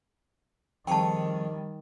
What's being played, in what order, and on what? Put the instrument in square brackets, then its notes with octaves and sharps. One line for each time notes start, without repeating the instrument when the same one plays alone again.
[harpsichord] F2 G#4 C#5 [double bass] D#3 G3 [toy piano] G5 A5